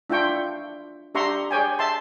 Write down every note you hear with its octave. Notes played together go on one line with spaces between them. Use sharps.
D4 E4 F4 G5 C#6
D4 G4 E5 A#5 C6 C#6
G#4 C#5 D5 G5 G#5
E5 A5 C6